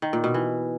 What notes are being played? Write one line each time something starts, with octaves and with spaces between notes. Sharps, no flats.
D#3
A#2
B2
E3